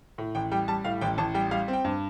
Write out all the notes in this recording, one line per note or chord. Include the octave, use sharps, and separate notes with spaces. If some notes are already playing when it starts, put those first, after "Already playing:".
A2
A1 G5
G3 G5
G3 A5
A2 F5
A1 G5
A1 A5
G3 G5
G3 F5
C4
G5
G2